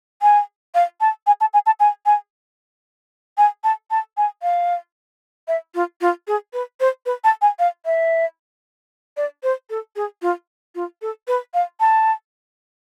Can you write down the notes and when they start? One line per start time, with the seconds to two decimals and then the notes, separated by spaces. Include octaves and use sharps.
0.22 G#5
0.75 F5
1.01 A5
1.27 G#5
1.41 A5
1.54 G#5
1.66 A5
1.80 G#5
2.06 G#5
3.38 G#5
3.64 A5
3.91 A5
4.17 G#5
4.43 F5
5.48 E5
5.75 F4
6.01 F4
6.27 G#4
6.53 B4
6.80 C5
7.06 B4
7.24 A5
7.42 G#5
7.59 F5
7.86 E5
9.17 D5
9.43 C5
9.70 A4
9.96 G#4
10.22 F4
10.75 F4
11.02 A4
11.28 B4
11.54 F5
11.80 A5